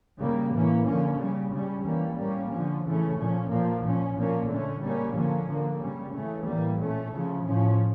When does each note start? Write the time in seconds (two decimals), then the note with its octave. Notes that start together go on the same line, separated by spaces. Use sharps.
0.20 C#3 G3 A#3
0.53 A2 E3 A#3 C#4
0.86 D3 F3 A#3 C#4
1.19 C#3 G3 C#4
1.52 C#3 G3 C#4
1.85 E3 G3 A#3 C#4
2.18 A2 G3 A#3 C#4
2.51 D3 F3 C#4
2.84 C#3 E3 A3 C#4
3.17 A#2 F3 C#4
3.50 A#2 F3 A#3
3.83 A#2 F3 C#4
4.16 A#2 F3 A#3 C#4
4.49 D3 A3 C#4
4.82 C#3 G3 A#3 C#4
5.15 D3 F3 A#3 C#4
5.48 D3 F3 A#3
5.81 C#3 G3 C#4
6.14 C#3 E3 A3 C#4
6.47 A2 E3 G3 A#3
6.80 A#2 A3 C#4
7.13 C#3 F3 C#4
7.46 A2 F3 C#4